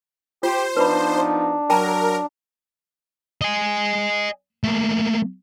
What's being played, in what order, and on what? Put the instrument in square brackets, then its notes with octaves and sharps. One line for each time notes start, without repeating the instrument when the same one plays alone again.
[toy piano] F4 [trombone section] G4 [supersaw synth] C5
[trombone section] F3 B3 D#4 [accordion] D4 [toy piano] B4 B5
[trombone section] F#3 [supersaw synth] A#4 [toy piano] G5 A5 A#5
[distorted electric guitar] D#5 G#5
A3 A#3